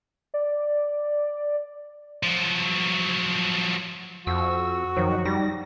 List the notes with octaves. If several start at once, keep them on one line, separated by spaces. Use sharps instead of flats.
D5
F3 F#3
F2 F#4 E6
F#2 D#3 F3 F#3
G3 D#4 A#6